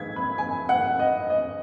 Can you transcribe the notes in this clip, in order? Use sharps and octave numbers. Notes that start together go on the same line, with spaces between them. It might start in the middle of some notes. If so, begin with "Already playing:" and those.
Already playing: D#3 G#3 G#6 B6
B5
G#5
F#5
D#5
D#5